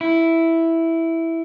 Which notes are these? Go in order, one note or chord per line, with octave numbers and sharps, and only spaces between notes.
E4